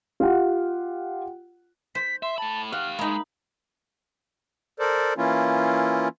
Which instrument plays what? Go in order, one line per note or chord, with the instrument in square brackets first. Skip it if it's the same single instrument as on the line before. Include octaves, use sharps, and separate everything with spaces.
[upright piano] F4 G4 F#5
[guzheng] C5 [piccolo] B6
[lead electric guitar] E5 [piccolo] C6
[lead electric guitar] A3 B5 [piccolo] A5
[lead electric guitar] G4 F5 [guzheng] F#5 [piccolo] F6
[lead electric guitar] G#3 [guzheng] A#3 D#4 [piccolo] B5
[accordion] A4 A#4 C5 D5
E3 A#3 C#4 E4 F4